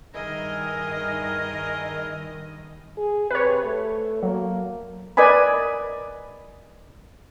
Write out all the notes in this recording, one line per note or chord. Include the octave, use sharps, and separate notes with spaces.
G2 D#3 E4 G#4 A#4 D#5 G#5
G#4
C3 B4 C#5
A3
F#3 A#3
A#4 B4 D5 D#5 G#5 B5